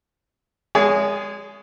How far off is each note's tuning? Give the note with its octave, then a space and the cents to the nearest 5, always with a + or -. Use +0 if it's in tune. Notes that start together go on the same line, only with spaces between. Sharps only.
G#3 -20 G#4 +0 C#5 +40